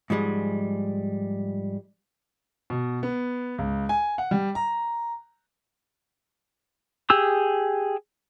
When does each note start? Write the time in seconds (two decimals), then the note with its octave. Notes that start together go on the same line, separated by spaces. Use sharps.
0.10 G#2 F3 G3 G#3
2.70 B2
3.03 B3
3.58 C#2
3.89 G#5
4.18 F#5
4.31 G3
4.55 A#5
7.10 G4 G#4 E6